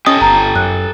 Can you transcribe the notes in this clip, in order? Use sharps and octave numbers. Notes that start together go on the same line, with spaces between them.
C#4 G4 A4 D#5 D#6
G1 A#5
F#2 F#6